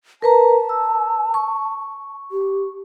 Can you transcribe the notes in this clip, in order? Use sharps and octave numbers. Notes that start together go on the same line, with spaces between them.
A#4 B4 A5 A#5
E6
C#6
G4